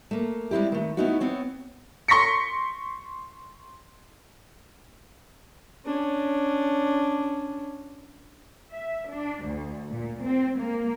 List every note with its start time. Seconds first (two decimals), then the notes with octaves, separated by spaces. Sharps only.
0.11 A3 A#3
0.51 G3 G#3 C4 E4 G4
0.72 D#3 A3
0.97 A3 B3 C#4 D#4 E4 F#4
1.20 B3 C4 C#5
2.08 C6 C#6 A#6 B6 C#7
5.86 C#4 D4
8.72 E5
9.12 D4
9.47 D2
9.90 A#2
10.25 C4
10.60 A#3